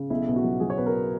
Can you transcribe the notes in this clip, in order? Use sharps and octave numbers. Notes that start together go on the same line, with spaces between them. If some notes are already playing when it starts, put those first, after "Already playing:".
Already playing: C#3
B1 E4
B2
F#4
F#3
F#3 G#4
C#5
B2 B4
A#4